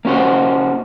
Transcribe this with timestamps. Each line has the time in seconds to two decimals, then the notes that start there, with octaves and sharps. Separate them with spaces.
0.05 A#3 C#4 F#4 C5